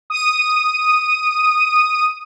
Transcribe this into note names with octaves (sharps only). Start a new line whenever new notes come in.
D#6 D#7